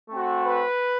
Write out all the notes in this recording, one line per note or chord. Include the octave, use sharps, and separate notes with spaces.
A3 C4 F#4
B4